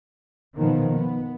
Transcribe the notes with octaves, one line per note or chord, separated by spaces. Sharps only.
B2 D#3 F3 B3
B3